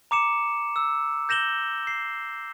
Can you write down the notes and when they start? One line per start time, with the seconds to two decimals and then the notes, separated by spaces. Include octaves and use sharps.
0.11 A#5 D6 C#7 E7
0.76 E6
1.29 G6 A#6 E7 F#7 G7
1.87 C7